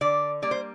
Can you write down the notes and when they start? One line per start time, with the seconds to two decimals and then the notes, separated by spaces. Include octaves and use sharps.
0.01 D3 D5
0.42 G3 A#3 D5
0.51 C5